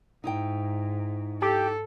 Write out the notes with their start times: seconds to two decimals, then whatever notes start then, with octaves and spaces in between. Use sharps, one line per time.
0.24 G#2 D#4 E4 G5
1.42 G4 A4